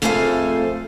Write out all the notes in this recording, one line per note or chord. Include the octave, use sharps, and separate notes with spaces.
F2 A3 G#4 A4 C5 F5